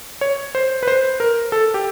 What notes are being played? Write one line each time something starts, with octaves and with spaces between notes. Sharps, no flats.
C#5
C5
B4
C5
A#4
A4
G4